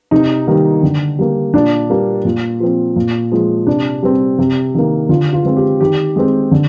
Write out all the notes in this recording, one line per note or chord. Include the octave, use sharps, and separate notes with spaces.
C3 D#4
D#3 G3 A#3
D3
G3 A#3
A#2 D4
G3 A#3
A#2
F3 C4
A#2
F3 G#3
C3 D4
G3 C4
C3
D#3 A#3
D3 F4
F4
G#3 C4
G4
D#3 G4
G#3 C4
D3